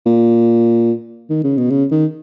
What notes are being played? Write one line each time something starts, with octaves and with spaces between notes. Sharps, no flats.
A#2
D#3
C#3
B2
C#3
D#3